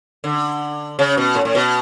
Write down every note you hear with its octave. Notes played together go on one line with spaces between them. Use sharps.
D3
C#3
B2
A2
A2
B2